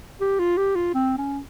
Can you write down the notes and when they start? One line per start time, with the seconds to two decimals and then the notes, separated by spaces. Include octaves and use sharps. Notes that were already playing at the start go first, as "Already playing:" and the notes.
0.21 G4
0.39 F4
0.58 G4
0.76 F4
0.94 C4
1.18 C#4